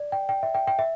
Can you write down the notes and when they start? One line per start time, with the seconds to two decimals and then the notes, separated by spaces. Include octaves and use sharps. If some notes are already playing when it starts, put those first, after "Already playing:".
Already playing: D5
0.12 G5
0.29 G5
0.43 E5
0.55 G5
0.67 G5
0.79 E5